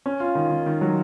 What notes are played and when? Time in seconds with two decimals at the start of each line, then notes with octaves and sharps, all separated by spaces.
0.06 C#4
0.20 F4
0.35 D#3
0.50 D#3
0.66 D#3
0.81 F#3